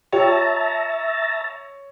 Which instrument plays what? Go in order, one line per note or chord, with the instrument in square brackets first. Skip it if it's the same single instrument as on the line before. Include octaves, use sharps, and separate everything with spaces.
[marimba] F4 G4 G5 [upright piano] C#5 [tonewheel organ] E5 A5 A#5